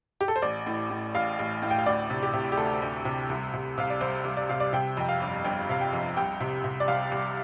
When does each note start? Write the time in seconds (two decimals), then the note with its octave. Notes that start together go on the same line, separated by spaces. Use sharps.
0.21 G4
0.28 A4
0.36 C5
0.42 A1 D5
0.66 A2
0.90 A2
1.15 A1 F5
1.39 A1
1.62 A2
1.71 G5
1.78 F5
1.86 D2 D5
2.10 C3
2.23 G4
2.33 C3
2.52 G4
2.57 D2 A4
2.82 D2
3.05 C3
3.29 C2
3.54 C3
3.78 C3 F5
3.90 D5
4.01 C2 C5
4.25 C2
4.37 D5
4.49 C3 F5
4.60 D5
4.73 C3 G5
4.97 F2 G5
5.09 F5
5.20 G1
5.45 G1 G5
5.69 C3 F5
5.81 G5
5.93 F2
6.17 C2 G5
6.40 C3
6.64 C3
6.80 D5
6.88 C2 F5
7.12 C2